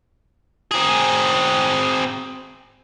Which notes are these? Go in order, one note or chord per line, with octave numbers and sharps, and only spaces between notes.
C4 G#4